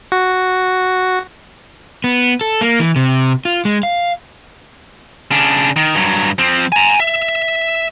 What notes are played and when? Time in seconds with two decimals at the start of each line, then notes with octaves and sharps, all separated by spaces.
0.12 F#4
2.04 B3
2.41 A4
2.61 A#3
2.80 E3
2.96 C3
3.45 F4
3.65 G#3
3.83 F5
5.31 C#3 D4
5.76 D#3
5.95 G2 F#3
6.39 F3 C4
6.72 G#5 A#5
7.00 E5